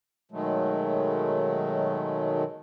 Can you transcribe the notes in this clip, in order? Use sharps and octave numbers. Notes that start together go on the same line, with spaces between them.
B2 D#3 F#3 G#3 A3